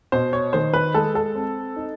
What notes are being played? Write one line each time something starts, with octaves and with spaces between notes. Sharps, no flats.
B2 C5
C#5
D#3 C5
B4
G#3 A4
A4
C4
D#4